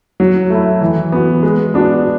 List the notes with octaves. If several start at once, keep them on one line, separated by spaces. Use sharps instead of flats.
F#3
A3 E4
E3
B3 F#4
G#3
B3 D4 F#4